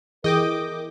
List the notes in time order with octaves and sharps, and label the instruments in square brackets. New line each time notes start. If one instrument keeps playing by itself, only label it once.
[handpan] E3 [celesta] G#4 [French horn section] A#4 [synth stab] D#5 G5 D6